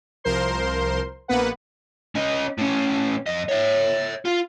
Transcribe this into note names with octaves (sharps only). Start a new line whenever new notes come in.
C2 F3 A#4 C5 C6
A#1 A#3 B3 B4 F#5
C#4 D#5
A2 C#4
F2 D#5
C#5 E5
F4